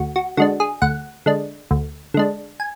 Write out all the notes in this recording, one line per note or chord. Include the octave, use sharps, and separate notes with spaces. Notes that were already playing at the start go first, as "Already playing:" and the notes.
Already playing: D2 F#4
F#4
D3 G#3 D4 F#4
G#4
D2 F#5
D3 G#3 D4
D2
D3 G#3 D4
G#5